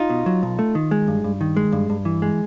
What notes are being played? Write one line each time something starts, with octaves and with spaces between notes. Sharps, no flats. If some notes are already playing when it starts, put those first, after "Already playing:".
Already playing: D#4 F4
B2
F#3
B1
A3
D#3
G#3
G2
G2
D#3
G#3
G2
G2
E3
G#3